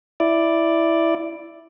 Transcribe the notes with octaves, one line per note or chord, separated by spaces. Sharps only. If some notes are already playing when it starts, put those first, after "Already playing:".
E4 D5